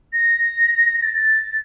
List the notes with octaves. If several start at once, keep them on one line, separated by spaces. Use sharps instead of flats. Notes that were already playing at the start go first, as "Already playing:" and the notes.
A#6
A6